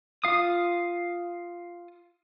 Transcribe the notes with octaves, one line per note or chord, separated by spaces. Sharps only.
F4 F5 D#6